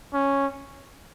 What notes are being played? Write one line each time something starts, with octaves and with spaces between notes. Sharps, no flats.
C#4